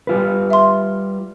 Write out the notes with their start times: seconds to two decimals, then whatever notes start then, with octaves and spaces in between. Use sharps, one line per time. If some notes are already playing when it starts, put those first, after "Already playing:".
0.07 G3 F4 B4
0.50 E5 C6